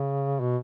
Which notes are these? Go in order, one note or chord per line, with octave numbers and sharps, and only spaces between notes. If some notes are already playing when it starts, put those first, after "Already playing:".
Already playing: C#3
B2